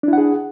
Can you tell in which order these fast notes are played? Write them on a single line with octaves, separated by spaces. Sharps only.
D4 E4 F#5 G#4